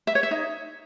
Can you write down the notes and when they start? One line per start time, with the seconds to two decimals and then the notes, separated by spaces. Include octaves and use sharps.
0.07 E5
0.15 C#5
0.23 E5
0.31 D#4